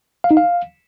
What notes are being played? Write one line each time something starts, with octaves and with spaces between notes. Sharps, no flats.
F5
D#4
F5